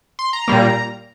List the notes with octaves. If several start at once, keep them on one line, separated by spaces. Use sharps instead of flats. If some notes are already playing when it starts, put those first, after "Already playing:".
C6
A#5
A#2 G3 A#3